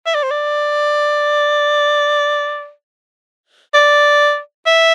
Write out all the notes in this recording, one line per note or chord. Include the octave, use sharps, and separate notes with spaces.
E5
D5
C5
D5
D5
E5